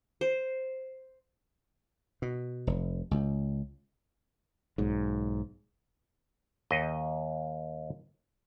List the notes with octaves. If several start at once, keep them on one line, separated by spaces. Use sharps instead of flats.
C5
B2
F1
C#2
B1 G#2
D#2 D#5